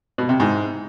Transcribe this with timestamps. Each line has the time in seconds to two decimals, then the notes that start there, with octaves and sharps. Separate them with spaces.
0.18 B2
0.29 C3
0.40 G#2